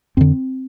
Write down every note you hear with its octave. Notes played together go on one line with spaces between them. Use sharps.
F2 D3 C4